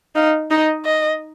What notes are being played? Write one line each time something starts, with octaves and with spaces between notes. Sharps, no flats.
D#4 F5
D#4 D#5
D#5